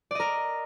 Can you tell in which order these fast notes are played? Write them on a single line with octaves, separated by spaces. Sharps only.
D5 D#5 A#4